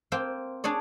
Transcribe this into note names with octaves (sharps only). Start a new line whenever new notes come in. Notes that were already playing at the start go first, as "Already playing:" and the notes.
A#3 C4 C5 G5
D4 G#4 C#5 D5